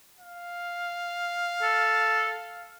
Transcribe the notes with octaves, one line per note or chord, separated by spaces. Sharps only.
F5
A4